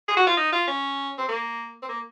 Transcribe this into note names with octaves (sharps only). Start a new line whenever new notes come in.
G#4
F#4
F4
D#4
F4
C#4
C4
A#3
C4
A#3